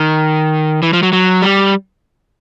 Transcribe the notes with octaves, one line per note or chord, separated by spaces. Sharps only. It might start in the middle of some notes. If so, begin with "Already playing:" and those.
Already playing: D#3
E3
F3
F#3
F#3
G3